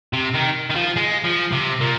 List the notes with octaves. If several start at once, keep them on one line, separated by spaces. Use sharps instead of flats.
C3
D#3
D#3
F3
G#3
F3
C3
A#2